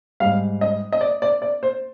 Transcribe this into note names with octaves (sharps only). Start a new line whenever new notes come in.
G#2 G3 F5
D#5
D#5
D5
D5
D5
C5